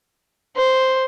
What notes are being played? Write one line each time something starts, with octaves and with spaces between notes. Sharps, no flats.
C5